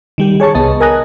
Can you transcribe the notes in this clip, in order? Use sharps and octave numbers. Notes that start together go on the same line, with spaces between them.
D#3 G3 G4
G#4 C#5 A5 C#6
C2 B3 D#5 A5
A#4 D#5 G#5 D#6 F#6 A#6